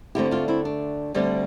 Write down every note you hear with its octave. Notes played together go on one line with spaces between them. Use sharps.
D2 D3 A3 C4 E4 G4
D4 F4
C4 E4
D4
D2 D3 G3 C4